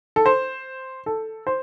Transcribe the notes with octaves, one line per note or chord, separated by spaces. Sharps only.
A4
C5
A4
C5